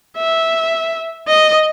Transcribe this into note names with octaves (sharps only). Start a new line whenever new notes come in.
E5
D#5